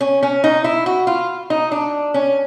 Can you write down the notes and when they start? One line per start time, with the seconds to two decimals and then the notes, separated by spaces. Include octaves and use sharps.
0.01 C#4
0.23 C#4
0.44 D#4
0.64 E4
0.86 F#4
1.07 F4
1.50 D#4
1.72 D4
2.14 C#4